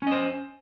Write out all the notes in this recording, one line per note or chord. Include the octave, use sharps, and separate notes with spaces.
C#4 C5 D#5